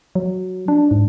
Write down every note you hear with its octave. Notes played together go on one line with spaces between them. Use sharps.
F#3
D4
G#2